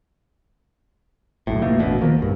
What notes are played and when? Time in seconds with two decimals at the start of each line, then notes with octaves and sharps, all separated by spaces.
1.47 F#1 B1 A2
1.62 F1 B2 A3 A#3
1.78 E1 A1 D2 B2
2.01 D#3 F3 A#3
2.19 B1 G2